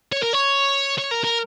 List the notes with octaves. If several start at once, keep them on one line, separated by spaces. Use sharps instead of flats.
C#5
A#4
C#5
C#5
A#4
A#4